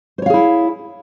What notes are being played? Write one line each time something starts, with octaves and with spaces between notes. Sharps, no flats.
E4 G#4 C5 C#5 F5